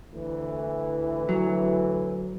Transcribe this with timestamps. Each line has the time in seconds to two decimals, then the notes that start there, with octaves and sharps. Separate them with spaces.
0.13 D2 E3
1.29 F#3